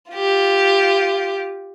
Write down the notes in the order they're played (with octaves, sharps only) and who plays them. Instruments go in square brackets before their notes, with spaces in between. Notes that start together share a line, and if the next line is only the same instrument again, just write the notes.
[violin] F4 G4